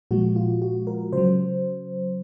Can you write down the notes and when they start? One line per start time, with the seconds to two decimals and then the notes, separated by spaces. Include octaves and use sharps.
0.11 A#2 F3 G#3 F#4
0.36 F4
0.62 F#4
0.87 A#4
1.13 C#3 F#3 C5